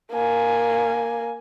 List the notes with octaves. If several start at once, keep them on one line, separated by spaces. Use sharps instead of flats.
A#3 G#5